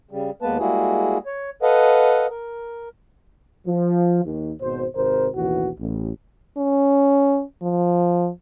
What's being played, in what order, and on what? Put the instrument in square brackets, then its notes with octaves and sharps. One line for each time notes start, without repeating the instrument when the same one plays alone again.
[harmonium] C#3 G3
D#2 G#3 A#3 B3 B4 A5
G3 G#3 A#3 E4 F#4 G#4
C#5
A4 B4 D#5 F5 F#5
A#4
[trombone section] F3
D#2
G#1 B2 C5
G#1 C3 A#4 C5
A1 D#2 B2 E3 F#4
A1
[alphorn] C#4
F3